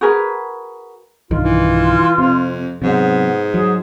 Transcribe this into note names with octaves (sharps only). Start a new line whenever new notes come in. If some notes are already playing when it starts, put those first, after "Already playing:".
F#4 G#4 A#4 B4
B1 G2 D#3 F4
E3
F2 C3
G#2 C3 F#3 B3
F#3 G#4